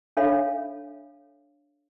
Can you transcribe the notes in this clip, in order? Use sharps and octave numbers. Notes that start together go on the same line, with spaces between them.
D4 A4 C#5 E5 F5 B5